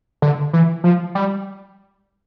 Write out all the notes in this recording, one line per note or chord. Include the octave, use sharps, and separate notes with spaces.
D3
E3
F3
G3